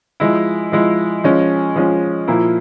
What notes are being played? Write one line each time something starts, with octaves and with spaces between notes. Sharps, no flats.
F3 G#3 E4
F3 G#3 E4
F3 G#3 C#4
F3 G#3 C#4
A#2 F3 A#3 E4